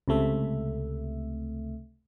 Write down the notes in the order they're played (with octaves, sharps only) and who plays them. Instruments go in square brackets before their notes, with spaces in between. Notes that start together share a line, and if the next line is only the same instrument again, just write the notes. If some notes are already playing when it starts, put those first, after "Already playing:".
[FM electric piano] C#2 C3 A3 E5